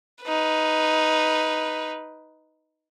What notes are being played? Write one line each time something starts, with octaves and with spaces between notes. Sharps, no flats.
D#4 B4